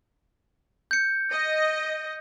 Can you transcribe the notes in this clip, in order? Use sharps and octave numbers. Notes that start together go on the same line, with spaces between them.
G6 C#7
D#5